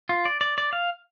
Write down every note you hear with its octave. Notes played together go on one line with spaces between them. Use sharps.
F4
D5
D5
D5
F5